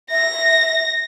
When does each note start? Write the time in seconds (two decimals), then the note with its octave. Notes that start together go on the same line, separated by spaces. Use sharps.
0.11 E5 A#6